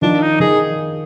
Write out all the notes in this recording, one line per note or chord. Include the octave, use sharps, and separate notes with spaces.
D#3 F3 D4
D#4
D#3 G#4